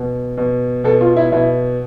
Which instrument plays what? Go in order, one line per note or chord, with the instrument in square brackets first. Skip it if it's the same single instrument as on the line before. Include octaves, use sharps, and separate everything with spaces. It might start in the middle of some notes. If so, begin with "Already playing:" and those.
Already playing: [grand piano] B2
B2
B2 A4
F4
E4
B2 E4